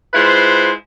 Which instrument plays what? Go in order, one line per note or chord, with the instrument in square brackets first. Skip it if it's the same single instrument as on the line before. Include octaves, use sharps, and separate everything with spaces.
[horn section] G#3 E4 F4 B4 C5